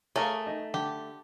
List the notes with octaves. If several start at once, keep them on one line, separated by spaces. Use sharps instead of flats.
A3 G#4 A#4 C#5 F5
D#4 D#5
D3 G4